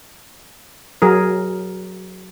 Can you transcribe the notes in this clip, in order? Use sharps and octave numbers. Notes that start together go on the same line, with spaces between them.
F#3 G#4 A#4